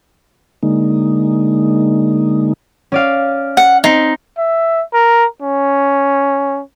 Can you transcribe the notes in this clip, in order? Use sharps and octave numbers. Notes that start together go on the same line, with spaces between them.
D3 G#3 A#3 D#4
C#4 D5 F5
F#5
C4 D#4 C7
E5
A#4
C#4